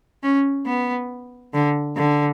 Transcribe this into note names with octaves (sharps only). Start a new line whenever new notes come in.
C#4
B3
D3
D3